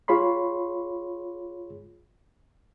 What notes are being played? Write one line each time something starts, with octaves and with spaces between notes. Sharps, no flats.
F4 G#4 C#5 B5 C6